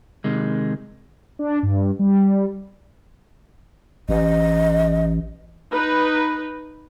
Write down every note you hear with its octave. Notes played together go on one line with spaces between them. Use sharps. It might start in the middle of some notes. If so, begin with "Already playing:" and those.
C3 D#3 G#3
D4
G2
G3
A1 D#5
D#4 B4